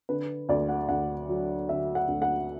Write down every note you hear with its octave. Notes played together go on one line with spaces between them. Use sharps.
D3 B4
D2 D5
F#5
D2 F#5
F#3
D3 E5
F#5
D2
F#5